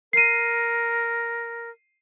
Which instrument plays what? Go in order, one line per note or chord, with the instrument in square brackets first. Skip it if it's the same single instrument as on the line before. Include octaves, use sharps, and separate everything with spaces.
[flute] A#4 [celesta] C7 D#7